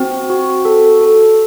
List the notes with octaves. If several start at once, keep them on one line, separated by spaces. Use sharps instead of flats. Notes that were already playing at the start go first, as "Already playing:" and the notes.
Already playing: C4 F#4
F#4
A4
A4